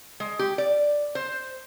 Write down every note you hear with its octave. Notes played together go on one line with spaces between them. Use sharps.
G#3
G4
D5
C5